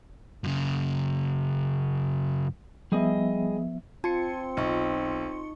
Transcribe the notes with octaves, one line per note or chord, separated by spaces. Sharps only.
F#2 C#3
F3 G3 B3 G#4 D#5 E5
C4 F4 A5 C6 G#6 C#7
B1 D#4 D#5 C#6